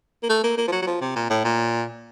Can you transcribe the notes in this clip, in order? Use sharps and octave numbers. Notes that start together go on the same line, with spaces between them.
A#3
A3
A#3
A#3
F3
F#3
F#3
F3
C3
A#2
A2
A#2